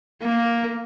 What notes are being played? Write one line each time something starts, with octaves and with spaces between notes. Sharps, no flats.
A#3